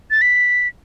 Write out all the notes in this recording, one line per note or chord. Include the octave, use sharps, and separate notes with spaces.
A6
B6